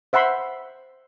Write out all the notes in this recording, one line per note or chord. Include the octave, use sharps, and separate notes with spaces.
C5 E5 F#5 B5 C6